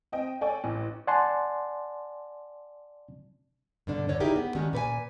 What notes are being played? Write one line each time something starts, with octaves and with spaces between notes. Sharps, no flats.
C4 D#5 G5
A4 C#5 D5 G5 G#5
A1
D5 F#5 G#5 A5 C6
G2 B2 D3 D4
E2 D3 C#5 D5
D#4 E4 G4 G#4 A#4
B3
D#3 G#3 C#4 D4 F#4 G4
A#2 B4 D5 G#5